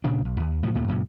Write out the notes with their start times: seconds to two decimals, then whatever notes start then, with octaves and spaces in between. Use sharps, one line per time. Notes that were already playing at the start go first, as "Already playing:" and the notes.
0.04 D2 A#2 C#3 D4
0.25 B1
0.40 D#2
0.63 A2 C3 F3 F#3
0.75 D#2 A#2 D#3 A3
0.88 F#2 A#2 C#3